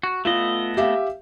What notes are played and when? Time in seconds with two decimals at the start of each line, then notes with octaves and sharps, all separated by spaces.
0.03 F#4
0.25 A3 B3 F4 D#5
0.77 G4 E5 F5